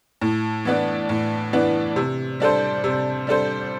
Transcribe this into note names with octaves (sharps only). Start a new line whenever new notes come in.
A2
E3 B3 D4
A2
E3 B3 D4
C3
G3 D4 A4 C5
C3
G3 D4 A4 C5